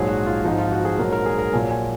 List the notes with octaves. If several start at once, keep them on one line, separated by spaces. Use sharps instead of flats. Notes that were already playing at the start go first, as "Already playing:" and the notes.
Already playing: A#1 G#2 F#3 G#4
F#4
F4
G#1 G#2 F3 D#4
F4
F#4
G#4
A#1 G#2 F#3 A#4
A#4
G#4
A#4
A#1 A#2 F#3 G#5
G#5